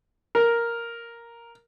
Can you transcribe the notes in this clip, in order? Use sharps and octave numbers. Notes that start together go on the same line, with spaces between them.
A#4